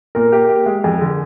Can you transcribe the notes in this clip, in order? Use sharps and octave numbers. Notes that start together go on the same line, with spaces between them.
A#2 A#4
G4
G4
G#3
F2 G#4
D3